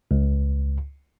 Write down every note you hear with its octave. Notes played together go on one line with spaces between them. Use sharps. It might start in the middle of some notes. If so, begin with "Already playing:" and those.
C#2